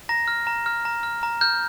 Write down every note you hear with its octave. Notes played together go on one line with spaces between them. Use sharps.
A#5 A#6
F6
A#5
F6
A#5
F6
A#5
F6 G6